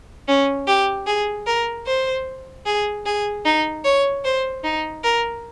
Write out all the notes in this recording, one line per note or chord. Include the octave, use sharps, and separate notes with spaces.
C#4
G4
G#4
A#4
C5
G#4
G#4
D#4
C#5
C5
D#4
A#4